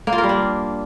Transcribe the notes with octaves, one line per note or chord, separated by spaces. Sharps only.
A#3
F4
A#4
G3
D4